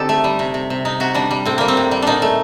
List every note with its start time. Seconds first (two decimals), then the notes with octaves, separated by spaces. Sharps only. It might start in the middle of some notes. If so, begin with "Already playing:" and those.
Already playing: D3 C4 D#4 G4 A4
0.09 A3
0.24 G3
0.39 C3
0.54 C3
0.70 C3
0.85 C3 D#4
1.00 C3 F#4
1.14 G3 D4
1.31 G3
1.45 A2 C4
1.58 G3 A#3
1.68 C4
1.77 A2
1.91 G3
2.02 A#2 D4 D#4
2.22 A3